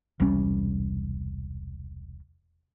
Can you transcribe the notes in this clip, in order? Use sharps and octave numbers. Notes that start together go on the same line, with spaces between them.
E1 C2 G3 C#4